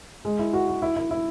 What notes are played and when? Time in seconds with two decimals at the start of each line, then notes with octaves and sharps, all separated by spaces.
0.25 G#3
0.39 E4
0.53 F#4
0.68 F#4
0.82 E4
0.96 E4
1.11 E4